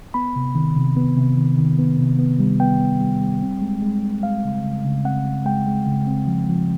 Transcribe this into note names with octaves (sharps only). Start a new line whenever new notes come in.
B3 B5
C3
D#3
C3
B3
C3
D#3
D#3
B3
C3
B3
G3
B3 G5
B3
G3
G3
C4
G#3
G#3
G#3
G#3 F5
C#3
C#3
C#3
C4 F#5
C#3
G#3 G5
G#3
C#3
C4
F3
F3